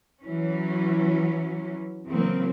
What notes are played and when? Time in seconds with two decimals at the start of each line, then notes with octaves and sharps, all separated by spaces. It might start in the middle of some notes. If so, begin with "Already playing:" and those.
0.21 E3 F#3 C#4
2.07 C#3 E3 F#3 A#3 C4